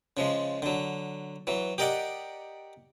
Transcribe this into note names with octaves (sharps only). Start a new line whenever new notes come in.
C#3 F3 G#3
D3 F#3
E3 F#3
G4 A#4 D5 D#5 F#5